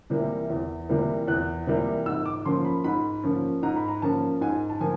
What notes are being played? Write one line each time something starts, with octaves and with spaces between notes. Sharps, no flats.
C3 E3 G3 A#3
E2
C3 E3 G3 A#3
E2 F#6
C3 E3 G3 A#3
G#2 E6
D6
F3 A#3 C#4 C6
B5
G#2 B5
F3 A#3 C#4
G#2 A#5
B5
A#5
F3 A#3 C#4 A5
G#2 G#5
A5
F3 A#3 G#5